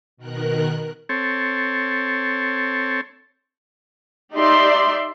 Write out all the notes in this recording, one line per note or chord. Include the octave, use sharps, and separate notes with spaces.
B2 D#3 A#4 F#6
C4 A4 C#5
D#4 G4 D5 E5 C6